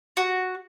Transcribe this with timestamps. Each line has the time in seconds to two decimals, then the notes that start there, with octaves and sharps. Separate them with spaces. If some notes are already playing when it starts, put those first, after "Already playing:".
0.17 F#4